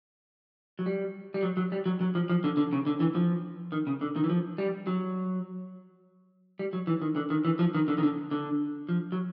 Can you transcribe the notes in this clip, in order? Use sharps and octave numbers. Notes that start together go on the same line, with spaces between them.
F#3
G3
G3
F#3
F#3
G3
F#3
F#3
F3
F3
D3
D3
C#3
D3
E3
F3
D#3
C#3
D3
D#3
E3
F3
G3
F#3
G3
F#3
E3
D#3
D3
D#3
E3
F3
D#3
D3
D#3
D3
D3
F3
F#3